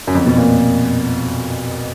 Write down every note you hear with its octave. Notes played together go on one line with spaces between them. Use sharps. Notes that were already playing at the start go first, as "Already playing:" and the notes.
F#2
F2
B2
A#2